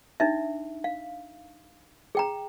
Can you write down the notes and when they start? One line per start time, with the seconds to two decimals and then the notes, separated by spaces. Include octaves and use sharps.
0.20 D4 D#4 E5
0.84 F5
2.15 G#4 G5 A#5